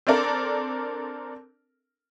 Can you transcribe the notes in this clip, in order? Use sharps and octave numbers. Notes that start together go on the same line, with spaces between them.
C4 D4 A4 A#4 D5